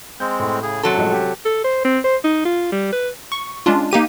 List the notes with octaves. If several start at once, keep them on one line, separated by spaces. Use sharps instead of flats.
G#3 C4 G6
A2
C#3 G#4
F#2 C3 F#3 A4
A2 F3 G#3
G4
A4
C5
C4
C5
D#4
F4
G3
B4
C#6
G#3 C#4 D4 F4
A#3 D#4 G4 D#7